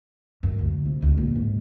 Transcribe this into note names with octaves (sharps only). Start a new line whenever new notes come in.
F#2
D2
C3
D2
A#1
G#2